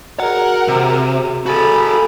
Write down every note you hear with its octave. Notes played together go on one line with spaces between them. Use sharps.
F#4 G#4 A#4 F#5
C3
F#4 G#4 A4 A5 B5